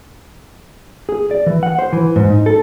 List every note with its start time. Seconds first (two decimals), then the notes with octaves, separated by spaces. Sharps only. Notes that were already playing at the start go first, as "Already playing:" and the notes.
1.09 G#4
1.31 D5
1.46 E3
1.63 F#5
1.79 C5
1.93 E3
2.16 G#2
2.30 D#4
2.46 A4